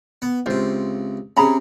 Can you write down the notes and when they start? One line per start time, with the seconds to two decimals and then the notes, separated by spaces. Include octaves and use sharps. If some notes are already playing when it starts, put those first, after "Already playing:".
0.22 B3
0.46 C#2 C3 F4 C5
1.37 C3 C#4 G#4 A#5 B5